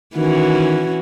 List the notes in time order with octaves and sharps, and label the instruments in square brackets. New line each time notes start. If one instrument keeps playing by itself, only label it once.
[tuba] D#3 [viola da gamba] E3 C#4 F#4